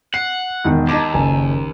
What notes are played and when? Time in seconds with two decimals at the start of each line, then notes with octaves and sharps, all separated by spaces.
0.14 F#5 C7
0.64 E1 D#3
0.89 D#2 D#4 A5 D6
1.14 F#1 G#5